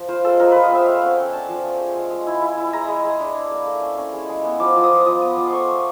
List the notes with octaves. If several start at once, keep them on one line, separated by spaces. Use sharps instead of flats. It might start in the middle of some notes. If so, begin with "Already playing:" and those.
Already playing: F3
F4 C5
G#3 A4
F3 A#4
F3 B4
D#5
C4 E5
A3 F5
C#4 F#5
C#4 G5
D4 A5
F3
F3
G#3
G#3
G#3
E4
E4
E4
G#3 A#5
G#3
G#3
D4
D4
A#3
A3
C#4
C#4
G#3
G#3
B3
F3 D6
F3
D#6
F3
F3 D#6
B3 D#6
F3 D6
C6
A3 C#6
A3